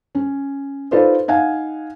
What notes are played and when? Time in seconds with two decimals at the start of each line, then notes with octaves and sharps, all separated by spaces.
0.15 C#4
0.91 D#4 F4 A4 B4 C5 D5
1.28 D#4 F5 F#5 G#5